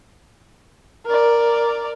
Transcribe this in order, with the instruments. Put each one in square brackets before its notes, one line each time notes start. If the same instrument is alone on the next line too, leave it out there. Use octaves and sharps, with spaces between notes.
[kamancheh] A#4 D5